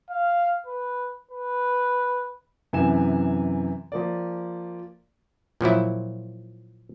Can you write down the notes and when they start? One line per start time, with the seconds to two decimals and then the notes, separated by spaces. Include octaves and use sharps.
0.10 F5
0.67 B4
1.31 B4
2.73 F#2 C3 E3 G#5 E7
3.92 F3 A#3 D5
5.61 A#2 F3 F#3 E4